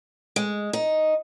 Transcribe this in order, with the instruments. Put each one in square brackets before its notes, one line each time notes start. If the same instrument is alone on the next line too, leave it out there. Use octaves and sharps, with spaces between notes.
[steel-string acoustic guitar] G#3
D#4